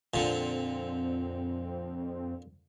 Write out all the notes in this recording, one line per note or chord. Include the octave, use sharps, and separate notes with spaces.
F2 A#2 D3 C4